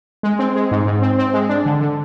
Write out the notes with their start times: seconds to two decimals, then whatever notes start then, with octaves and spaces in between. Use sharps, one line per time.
0.23 G#3
0.39 C4
0.56 G#3
0.71 G#2
0.86 G#2
1.02 C4
1.18 C4
1.34 G#3
1.49 D4
1.65 D3
1.81 D3